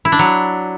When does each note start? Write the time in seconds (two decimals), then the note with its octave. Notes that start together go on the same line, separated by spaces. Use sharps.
0.05 E4
0.12 D4
0.19 F#3